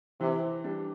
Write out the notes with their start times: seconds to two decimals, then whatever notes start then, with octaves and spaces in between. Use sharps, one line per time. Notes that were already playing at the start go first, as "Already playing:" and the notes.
0.20 C3 E3
0.64 G3 D4